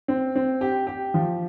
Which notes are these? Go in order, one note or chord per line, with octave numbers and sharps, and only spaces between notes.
C4
C4
G4
G4
F3